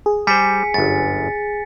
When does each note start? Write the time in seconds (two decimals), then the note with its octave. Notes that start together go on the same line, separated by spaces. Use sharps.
0.06 G#4
0.27 G3 C5 G#5 B6 C#7
0.74 G1 F#2 A6